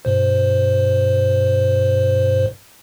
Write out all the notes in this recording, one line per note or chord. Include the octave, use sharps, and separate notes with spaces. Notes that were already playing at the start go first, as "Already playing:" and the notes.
G2 B2 C5